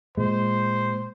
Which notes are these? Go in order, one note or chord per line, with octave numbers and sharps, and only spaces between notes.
A#2 G#3 C5